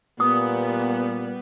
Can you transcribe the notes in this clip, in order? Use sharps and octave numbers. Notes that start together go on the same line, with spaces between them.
A#2 G3 B3 D#6